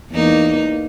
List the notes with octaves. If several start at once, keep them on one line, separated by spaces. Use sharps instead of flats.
E2 A#3 D#4